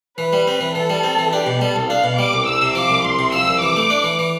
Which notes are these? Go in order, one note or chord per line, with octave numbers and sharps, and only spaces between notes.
E3 B4
G3
C4 B4
E3
E3 A4
G3
C4
E3
D4 G4
B2
G3 A4
C2
D4 F5
B2
G3 D6
C2
C2 E6
C3
F3 D6
C2
C2 C6
C3
F3 E6
C2
E3 D6
A3
D4
E3
E3